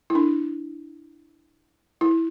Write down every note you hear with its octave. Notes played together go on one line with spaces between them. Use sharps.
E4
D4
E4